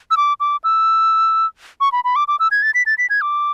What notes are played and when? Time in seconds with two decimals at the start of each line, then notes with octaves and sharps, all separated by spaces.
0.11 E6
0.17 D6
0.40 D6
0.64 E6
1.81 C#6
1.92 B5
2.04 B5
2.16 D6
2.28 D6
2.40 E6
2.51 G#6
2.62 A6
2.74 B6
2.86 A6
2.98 B6
3.10 G#6
3.21 D6